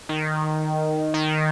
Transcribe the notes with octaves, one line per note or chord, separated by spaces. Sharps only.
D#3
D#3